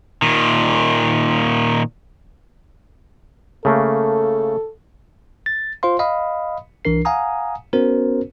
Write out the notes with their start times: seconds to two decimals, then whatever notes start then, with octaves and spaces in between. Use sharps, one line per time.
0.22 A#2 D#3
3.65 C#3 A3 A#3 A4
5.46 A6
5.83 F4 C5 F5 C6
5.99 D#5 F5 B5 D#6
6.85 C2 E3 D4 A#4 C7
7.05 F5 F#5 G#5 A#5 D#6
7.73 B3 C#4 F#4 A#4 C5